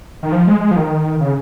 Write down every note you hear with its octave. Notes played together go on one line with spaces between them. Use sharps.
D#3
F3
G#3
G#3
F3
D#3
C#3